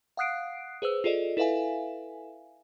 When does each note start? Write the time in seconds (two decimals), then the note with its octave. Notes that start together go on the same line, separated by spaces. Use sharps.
0.17 F5 F#5 D#6 F#6 C7 D7
0.82 G#4 B4 C5 E6
1.04 F4 G#4 A4 D5 D#5
1.37 E4 A4 B4 E5 F5 G#5